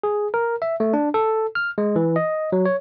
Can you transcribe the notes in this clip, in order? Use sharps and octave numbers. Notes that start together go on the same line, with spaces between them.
G#4
A#4
E5
A3
D4
A4
F6
G#3
E3
D#5
F#3
C#5